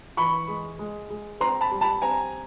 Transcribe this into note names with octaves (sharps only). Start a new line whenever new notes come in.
E3 B5 C#6
G#3
G#3
G#3
C4 A#5 C6
A5 B5
G3
A5 B5
C4 G#5 A#5